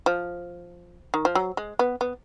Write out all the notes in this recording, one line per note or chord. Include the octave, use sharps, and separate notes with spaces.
F3
D#3
F3
F#3
G#3
B3
B3